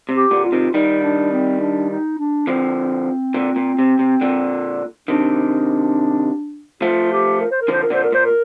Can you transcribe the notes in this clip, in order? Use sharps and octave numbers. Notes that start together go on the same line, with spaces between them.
C3
G4
A#2 D3
F4
C3 D#3
D#3 G3 D#4
D4
C4
D4
D#4
D4
D3 F3 C4
A#2 D3
A#2
C3
C3
A#2 D3
C3 D#3 D4
F3 A3 F4
G4
A#4
C5
A#4
D3 F3 C5
A#4
A#2 D3 C5
A#4
A#2 C5
A#4